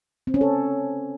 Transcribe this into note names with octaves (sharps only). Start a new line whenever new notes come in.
C4
C#4
A4